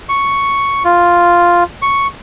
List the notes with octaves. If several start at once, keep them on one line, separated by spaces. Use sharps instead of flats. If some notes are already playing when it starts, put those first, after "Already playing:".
C#6
F4
C#6